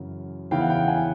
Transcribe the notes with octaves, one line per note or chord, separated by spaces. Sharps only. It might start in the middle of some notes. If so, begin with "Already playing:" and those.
Already playing: F#2 C#3 E3
E2 C#3 E3 F5 G5
F#5
F5 G5
F#5 G#5